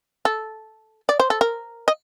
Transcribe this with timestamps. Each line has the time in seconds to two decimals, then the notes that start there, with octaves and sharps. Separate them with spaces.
0.25 A4
1.09 D5
1.20 C5
1.30 A4
1.41 A#4
1.88 D#5